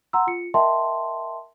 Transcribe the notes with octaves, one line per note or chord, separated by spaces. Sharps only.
F#5 A#5 C6 E6
F4 C#7
A#4 D#5 E5 G5 A5 C6